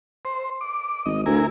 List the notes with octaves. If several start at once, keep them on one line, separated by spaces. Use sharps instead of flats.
C5
D6
G#1 D#5
D2 E4 A#4 G#5